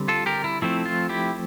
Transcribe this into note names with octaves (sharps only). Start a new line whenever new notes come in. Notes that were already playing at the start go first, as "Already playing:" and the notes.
Already playing: D3 G3 C4
F4 A4
G4 A#4
E4
F3 A3 C4 E4
F4
E4 G4